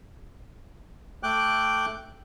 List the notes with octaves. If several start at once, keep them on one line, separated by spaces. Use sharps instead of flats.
A3 G5 D6 F#6